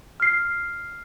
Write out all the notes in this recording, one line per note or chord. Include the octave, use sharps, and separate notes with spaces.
F6 C7